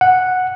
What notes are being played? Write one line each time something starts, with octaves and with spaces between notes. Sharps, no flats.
F#5